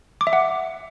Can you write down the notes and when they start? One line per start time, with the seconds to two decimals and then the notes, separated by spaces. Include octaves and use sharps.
0.21 D6
0.27 E5
0.33 F#5